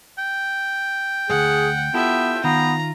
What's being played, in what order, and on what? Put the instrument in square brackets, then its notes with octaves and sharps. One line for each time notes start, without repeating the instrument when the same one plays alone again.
[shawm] G5
[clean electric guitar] D2 G2 [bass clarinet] G#4 [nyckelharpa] F#5
[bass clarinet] B3 [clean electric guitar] E4 G4 A4 [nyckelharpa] F4 E5
[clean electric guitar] D#3 F4 [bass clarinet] B3 [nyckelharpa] A#5